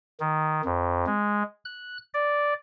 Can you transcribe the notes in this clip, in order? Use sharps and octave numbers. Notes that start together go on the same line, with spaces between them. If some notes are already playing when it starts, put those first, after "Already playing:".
D#3
F2
G#3
F#6
D5